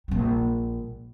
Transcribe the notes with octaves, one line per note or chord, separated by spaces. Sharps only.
A#1 G3